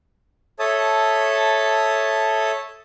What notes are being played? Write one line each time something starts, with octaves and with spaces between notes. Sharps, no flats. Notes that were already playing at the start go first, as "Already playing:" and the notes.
A4 C#5 E5 A5 D#6